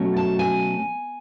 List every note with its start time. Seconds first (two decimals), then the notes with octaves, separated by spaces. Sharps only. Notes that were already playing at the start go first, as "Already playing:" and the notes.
Already playing: B2 F#3 A3 C#4
0.16 A5
0.39 G#5